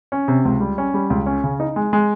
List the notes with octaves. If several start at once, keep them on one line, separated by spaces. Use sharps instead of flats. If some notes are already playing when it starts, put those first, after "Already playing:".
C#4
C3
C#2
G3
C#4
G3
C#2
C#4
C#3
D#4
G#3
G#3